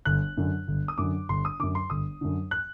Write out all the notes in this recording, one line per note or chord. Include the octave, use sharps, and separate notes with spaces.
G1 F#6
F#2 D3
G1
D#6
F#2 D3 D6
G1 C6
D#6
F#2 D3 D6
C6
G1 D#6
F#2 D3
F#6